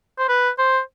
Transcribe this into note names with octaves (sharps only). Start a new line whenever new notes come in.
C5
B4
C5